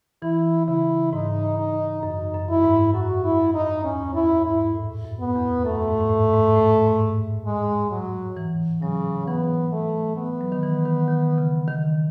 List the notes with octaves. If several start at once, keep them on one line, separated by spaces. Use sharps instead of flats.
E3 E4
C#3 E4
G#2 D#4
D#4
F#2 D#4
F#2
E4
G#2
F#2 F#4
E4
F#2
D#4
E2 C#4
F#2 E4
G#2 E4
A2
F#2
B3
E2
F#2 A3
G#2
G#2
A2
G#2
A2
G#2
G#3
F#3
E3
C#3 F#3
E3 B3
A3
B3
F#3
D#3
E3
D#3
D#3
C#3
D#3